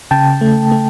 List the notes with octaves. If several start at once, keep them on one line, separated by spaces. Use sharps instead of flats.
C#3 G5 A5
A3
A3